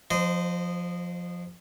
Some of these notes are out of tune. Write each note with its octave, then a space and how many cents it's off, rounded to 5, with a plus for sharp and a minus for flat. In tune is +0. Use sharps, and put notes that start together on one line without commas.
F3 +15 C5 -25 D#5 -20